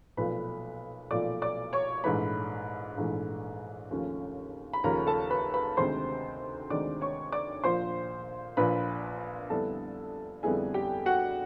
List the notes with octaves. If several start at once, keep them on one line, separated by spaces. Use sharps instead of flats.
B1 A#2 F3 A3 B4 B5
B1 A#2 F3 A3 D5 D6
D5 D6
C#5 C#6
A#1 G#2 E3 A3 B4 B5
A#1 G#2 E3 A3
D#2 C#3 F3 A3 C#4
B5
D#2 C#3 F3 A3 C#4 A#4 A#5
A4 A5
B4 B5
B4 B5
D2 C3 D#3 G#3 C5 C6
D2 C3 D#3 G#3 D5 D6
C#5 C#6
D5 D6
A#1 A#2 F3 C5 C6
A#1 A#2 F3 B4 B5
F2 D3 G3 B3 E4 A4 A5
F2 D3 G3 B3 E4 G#4 G#5
G4 G5
F#4 F#5